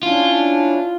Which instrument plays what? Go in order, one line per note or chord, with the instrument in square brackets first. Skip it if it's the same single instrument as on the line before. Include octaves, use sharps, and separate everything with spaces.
[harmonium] C#4 D4 E4 [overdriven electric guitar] F4